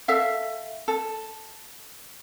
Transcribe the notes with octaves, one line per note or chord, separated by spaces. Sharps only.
A4 E5 F5
A4